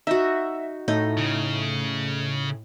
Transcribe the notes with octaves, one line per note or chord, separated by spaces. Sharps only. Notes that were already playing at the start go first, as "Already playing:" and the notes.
D#4 F#4 E5
A2 D#4
C#3